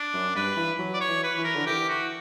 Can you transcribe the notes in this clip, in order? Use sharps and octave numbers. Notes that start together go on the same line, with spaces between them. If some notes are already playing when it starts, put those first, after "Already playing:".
Already playing: D4
F#2
G2 B4
E3
F#3
D5
C#5
E3
B4
E3
A#4
D3
E3 G4
F#4